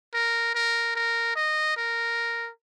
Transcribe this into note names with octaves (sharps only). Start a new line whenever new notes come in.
A#4
A#4
A#4
D#5
A#4